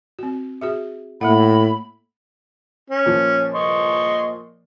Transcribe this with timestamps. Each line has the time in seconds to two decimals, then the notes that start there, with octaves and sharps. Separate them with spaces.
0.19 C4 F#4
0.61 F#4 G#4 E5
1.21 A2 A#3 E5 F#5 B5
2.90 C#4
3.06 A#2 F3
3.54 D#5 C6 C#6